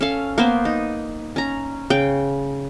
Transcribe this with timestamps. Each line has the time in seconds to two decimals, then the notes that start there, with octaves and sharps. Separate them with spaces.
0.01 C#4 A4 F5
0.38 A#3 B3 C5
0.65 D#4
1.36 C#4 A#5
1.90 C#3 G5